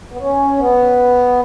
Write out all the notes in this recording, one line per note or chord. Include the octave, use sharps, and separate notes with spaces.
B3
C#4
B3